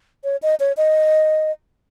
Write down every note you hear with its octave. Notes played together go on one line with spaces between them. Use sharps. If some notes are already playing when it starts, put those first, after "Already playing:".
C#5
D#5
C#5
D#5